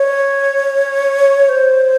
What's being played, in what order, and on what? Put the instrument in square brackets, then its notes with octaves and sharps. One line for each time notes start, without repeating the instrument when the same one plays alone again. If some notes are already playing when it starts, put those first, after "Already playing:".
Already playing: [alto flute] C#5
C5